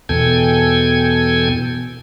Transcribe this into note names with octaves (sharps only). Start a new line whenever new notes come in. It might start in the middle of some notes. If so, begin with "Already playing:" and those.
E2 B2 A4 G5 G#5 G#6